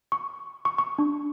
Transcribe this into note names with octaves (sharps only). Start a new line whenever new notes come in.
C#6
C#6
C#6
D4